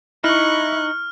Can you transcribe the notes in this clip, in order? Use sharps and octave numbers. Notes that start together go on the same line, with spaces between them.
D#4 E4 C#6 F6 F#6